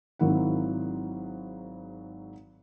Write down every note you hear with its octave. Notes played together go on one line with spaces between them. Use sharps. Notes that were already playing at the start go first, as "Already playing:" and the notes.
G#1 G#2 F#3 E4 A#4 F#5